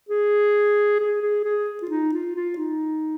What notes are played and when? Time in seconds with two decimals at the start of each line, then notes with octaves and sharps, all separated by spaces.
0.09 G#4
1.00 G#4
1.22 G#4
1.44 G#4
1.82 F4
1.90 D#4
2.13 F4
2.36 F4
2.58 D#4